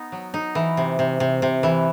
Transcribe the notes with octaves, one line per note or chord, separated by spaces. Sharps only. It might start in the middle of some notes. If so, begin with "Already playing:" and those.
Already playing: B3 D#4
F#3
D#4
E3
C3
C3
C3
C3
E3